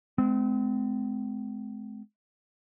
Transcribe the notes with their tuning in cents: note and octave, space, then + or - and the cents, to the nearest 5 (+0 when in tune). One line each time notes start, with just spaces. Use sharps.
G#3 +35 C4 -35